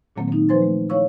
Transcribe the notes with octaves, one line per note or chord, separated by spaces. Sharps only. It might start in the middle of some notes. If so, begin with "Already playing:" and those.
A#2 D#3 F#3 A#3 C4
A#3 D#4
F3 B4 C5 G#5 C6 A6
A3
E4 C#5 F5 C#6 E6